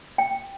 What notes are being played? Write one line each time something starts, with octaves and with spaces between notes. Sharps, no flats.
G5